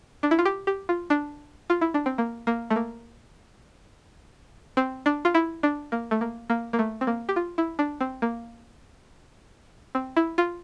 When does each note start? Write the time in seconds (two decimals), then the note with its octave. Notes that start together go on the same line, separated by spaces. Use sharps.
0.23 D4
0.31 E4
0.39 F4
0.45 G4
0.67 G4
0.89 F4
1.10 D4
1.70 F4
1.81 E4
1.94 D4
2.06 C4
2.18 A#3
2.47 A#3
2.70 A3
2.76 A#3
4.77 C4
5.06 D4
5.25 F4
5.35 E4
5.63 D4
5.92 A#3
6.11 A3
6.21 A#3
6.50 A#3
6.73 A#3
6.79 A3
7.01 C4
7.07 A#3
7.29 G4
7.36 F4
7.58 E4
7.79 D4
8.01 C4
8.22 A#3
9.95 C4
10.17 E4
10.38 F4